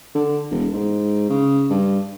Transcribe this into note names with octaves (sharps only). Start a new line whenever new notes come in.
D3
E1
G#2
C#3
G2